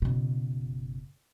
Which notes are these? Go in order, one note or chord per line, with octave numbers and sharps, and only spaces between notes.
F#1 B2